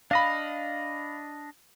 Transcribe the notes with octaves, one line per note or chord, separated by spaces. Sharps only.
D4 D#5 F5 B5